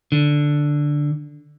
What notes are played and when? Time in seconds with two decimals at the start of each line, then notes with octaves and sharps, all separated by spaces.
0.12 D3